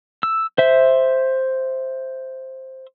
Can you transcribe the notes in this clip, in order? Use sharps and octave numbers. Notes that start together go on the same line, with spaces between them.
E6
C5 E5